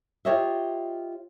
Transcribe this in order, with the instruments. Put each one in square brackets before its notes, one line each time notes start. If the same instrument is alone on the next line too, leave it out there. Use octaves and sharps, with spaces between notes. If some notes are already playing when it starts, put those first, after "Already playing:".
[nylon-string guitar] F4 G4 C#5 D#5 E5